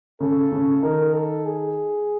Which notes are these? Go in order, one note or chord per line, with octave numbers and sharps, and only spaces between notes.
C#3 C#4 A4
C#3 C#4
D#3 D#4 A#4
A4
G#4